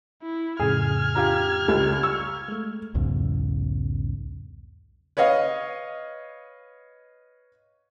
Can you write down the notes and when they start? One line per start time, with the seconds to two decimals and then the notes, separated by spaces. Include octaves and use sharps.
0.22 E4
0.60 F2 A2 C#3 G#4 F6 G#6
1.15 F4 G4 A#5
1.68 C#2 G3
2.03 C#6 E6
2.48 G#3 A3
2.95 B1 E2 G#2 C#3
5.17 B4 C#5 D#5 F5